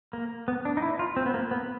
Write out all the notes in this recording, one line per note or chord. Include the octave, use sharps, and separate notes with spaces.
A#3
B3
D4
D#4
E4
F4
C4
B3
A#3
B3